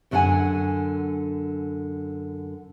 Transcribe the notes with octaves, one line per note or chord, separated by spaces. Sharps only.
F#2 D3 D4 A4 F#5 G#5